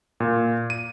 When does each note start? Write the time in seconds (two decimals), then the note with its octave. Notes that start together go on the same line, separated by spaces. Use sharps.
0.20 A#2
0.70 D#7